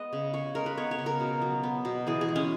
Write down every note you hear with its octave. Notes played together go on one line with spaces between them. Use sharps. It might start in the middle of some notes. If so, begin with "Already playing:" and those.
Already playing: G#3 B3 B4 D#5
C#3
C#3 C#5
G#3 A#4
B4
B3 C#5
C#5
C#3
A#4
B2
F#3
B3
B2
E3 G#4
G#4
G#3
C#4